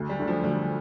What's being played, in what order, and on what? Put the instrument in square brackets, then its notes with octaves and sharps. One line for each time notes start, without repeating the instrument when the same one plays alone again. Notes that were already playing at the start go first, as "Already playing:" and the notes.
Already playing: [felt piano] D2
[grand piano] G3
[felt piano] D3 A3 D4
[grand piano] F3
[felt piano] D2 [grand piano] G3